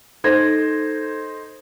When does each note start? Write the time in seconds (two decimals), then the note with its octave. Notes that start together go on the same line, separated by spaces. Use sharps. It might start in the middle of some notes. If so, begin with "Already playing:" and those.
0.24 D#4 A4 C5 G#6 A#6